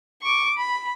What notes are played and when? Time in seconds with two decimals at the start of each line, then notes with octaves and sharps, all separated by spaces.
0.22 C#6 D6
0.57 B5